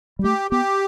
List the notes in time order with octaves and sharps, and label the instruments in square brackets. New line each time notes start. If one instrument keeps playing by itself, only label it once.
[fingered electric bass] G3
[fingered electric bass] A3 [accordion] G4
[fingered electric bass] B3 [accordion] G4